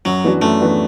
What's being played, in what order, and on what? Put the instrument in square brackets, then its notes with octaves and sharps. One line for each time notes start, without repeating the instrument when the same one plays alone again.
[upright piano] F#2 [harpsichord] F#3
[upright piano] E3 B3 D4 F#4
[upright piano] F#2 [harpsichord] A3
[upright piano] E3 B3 D4 F#4